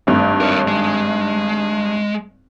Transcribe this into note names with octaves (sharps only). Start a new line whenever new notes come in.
G#1 G2 A3
A#4 C#5
G#3